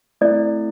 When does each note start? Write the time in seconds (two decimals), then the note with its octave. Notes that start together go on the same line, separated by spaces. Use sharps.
0.21 A3 C4 E4 D5